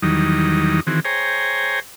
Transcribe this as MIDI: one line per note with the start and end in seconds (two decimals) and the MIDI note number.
0.02 0.80 40
0.02 0.80 51
0.02 0.80 54
0.02 0.80 55
0.02 0.80 63
0.87 1.00 51
0.87 1.00 52
0.87 1.00 60
0.87 1.00 66
0.87 1.00 68
1.05 1.80 68
1.05 1.80 72
1.05 1.80 73
1.05 1.80 79
1.05 1.80 80
1.05 1.80 82